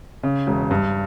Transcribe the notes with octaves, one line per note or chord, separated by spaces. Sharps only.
C#3
E1
G2